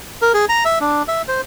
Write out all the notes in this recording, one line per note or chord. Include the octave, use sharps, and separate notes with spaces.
A#4
G#4
A#5
E5
D4
E5
C5